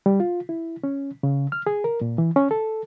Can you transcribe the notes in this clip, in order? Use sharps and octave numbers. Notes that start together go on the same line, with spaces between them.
G3
F4
E4
C#4
C#3
F6
G#4
A#4
A#2
E3
C#4
A4